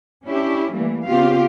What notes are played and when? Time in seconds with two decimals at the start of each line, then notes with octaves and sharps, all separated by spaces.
0.25 C#4 D4 E4 G4
0.73 E3 G3 A3 A#3
1.04 C#3 B3 C4 F4 G4 F5